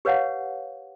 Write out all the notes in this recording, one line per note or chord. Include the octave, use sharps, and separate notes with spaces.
G4 B4 C#5 F5 F#5